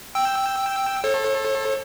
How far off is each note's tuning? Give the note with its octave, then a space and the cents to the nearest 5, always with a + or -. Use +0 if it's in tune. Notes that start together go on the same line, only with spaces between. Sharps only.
G5 +0 E6 +0
A4 +0 C#5 -45